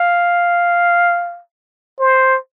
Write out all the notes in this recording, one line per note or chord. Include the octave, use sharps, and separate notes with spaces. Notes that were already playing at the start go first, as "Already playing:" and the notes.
Already playing: F5
C5